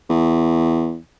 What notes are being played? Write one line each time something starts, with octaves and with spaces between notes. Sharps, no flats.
E2